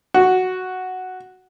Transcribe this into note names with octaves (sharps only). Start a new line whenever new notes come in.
F#4